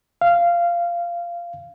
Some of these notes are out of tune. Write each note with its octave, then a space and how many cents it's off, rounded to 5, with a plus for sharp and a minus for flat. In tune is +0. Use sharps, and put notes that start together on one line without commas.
F5 -15